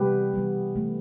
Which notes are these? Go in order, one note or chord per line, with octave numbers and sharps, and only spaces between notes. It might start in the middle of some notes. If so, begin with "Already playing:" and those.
Already playing: C3 E3 G3 B3 G4 B4
E3 G3 B3
E3 A3